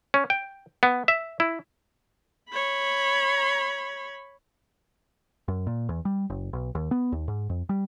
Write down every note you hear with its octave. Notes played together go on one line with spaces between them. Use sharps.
C#4
G5
B3
E5
E4
C#5 B5
F#2
A#2
E2
G3
F#1
B1
D#2
B3
D#2
G#2
F2
G3